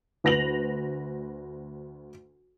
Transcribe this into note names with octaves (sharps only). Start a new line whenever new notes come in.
D2 B4 A#6 F7 F#7